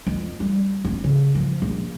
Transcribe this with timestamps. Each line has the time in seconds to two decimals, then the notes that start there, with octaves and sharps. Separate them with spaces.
0.07 F2
0.40 G3
0.85 D#1
1.04 C#3
1.35 F3
1.62 A#1